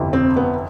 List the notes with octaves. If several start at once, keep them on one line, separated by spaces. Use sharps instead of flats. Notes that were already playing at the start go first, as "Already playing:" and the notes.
Already playing: G1 F2 C3 E3
C4
B3